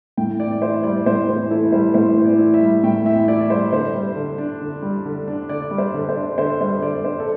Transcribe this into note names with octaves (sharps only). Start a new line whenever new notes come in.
A2 G5
E3 D5
E4 C5
G3 D5
A2 C5
E3 C5
E4 A4
G3 C5
A2 C5
E3
D5
E4
E5
G3
A2 G5
E3 E5
E4 D5
G3 C5
D3 C5
G3
D3
D4
D3
G3
D3
D4
D3 D5
G3
C5
D3
C5
D4
D3 C5
G3 C5
D3 D5
D4 C5
A4